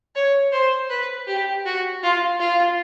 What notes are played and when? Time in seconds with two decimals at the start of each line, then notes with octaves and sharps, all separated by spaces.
0.15 C#5
0.52 C5
0.90 B4
1.27 G4
1.66 F#4
2.03 F4
2.39 F4